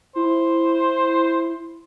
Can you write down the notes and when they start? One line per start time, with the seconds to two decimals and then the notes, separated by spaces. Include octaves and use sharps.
0.16 E4 C5